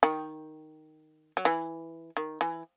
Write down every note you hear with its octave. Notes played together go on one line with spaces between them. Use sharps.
D#3
F#3
E3
D#3
E3